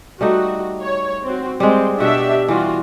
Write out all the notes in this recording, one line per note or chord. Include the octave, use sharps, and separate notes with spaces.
G3 A3 D#4 F#4
C#5
C4 F#4
G3 G#3 C4
B2 D4 F#4 G4 E5
E3 G3 F4 F#4